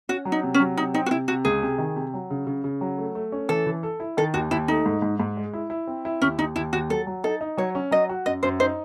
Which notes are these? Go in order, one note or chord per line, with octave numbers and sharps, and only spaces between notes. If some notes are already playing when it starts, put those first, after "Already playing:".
C#4 F#4
F#3
D#4
C3
C#4
F#3
C3 D#4
C4 D#4
F#4
C3 E4
C3 F#4
C#2 G#4
C3
D#3
C3
F#3
C#3
C#3
C#3
F#3
A3
A3
C#4
E3 A4
E3
A4
E4
D#3 A4
D#2 F#4
D#2 E4
A3 D#4
G#2
G#2
G#2
G#3
E4
E4
C4
E4
D#2 C#4
D#2 D#4
D#2 E4
D#2 F#4
F#3 A4
F#3
D#4 A4
D#4
F#3 C#5
C#4
F#3 D#5
F#4
F#2 D#5
F#2 C5
D#4 C5